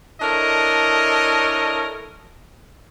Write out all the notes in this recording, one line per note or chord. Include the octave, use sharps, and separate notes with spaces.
D4 E4 A4 A#4 C#5 D#5